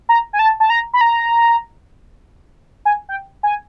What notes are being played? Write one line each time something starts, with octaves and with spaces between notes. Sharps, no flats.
A#5
G#5
A5
A5
A#5
B5
A#5
G#5
G5
G#5